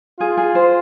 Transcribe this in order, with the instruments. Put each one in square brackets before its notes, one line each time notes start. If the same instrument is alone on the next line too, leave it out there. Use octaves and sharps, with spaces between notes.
[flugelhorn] F4 [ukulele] G#4
[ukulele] G#4
C5